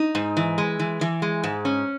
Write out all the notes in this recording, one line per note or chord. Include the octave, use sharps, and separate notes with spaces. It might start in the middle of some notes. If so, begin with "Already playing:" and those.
Already playing: D#4
G#2
E3
G#3
E3
E3
G#3
G#2
C#4